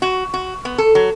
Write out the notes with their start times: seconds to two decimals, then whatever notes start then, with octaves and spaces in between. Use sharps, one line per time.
0.02 F#4
0.34 F#4
0.65 B3
0.78 A4
0.95 F#3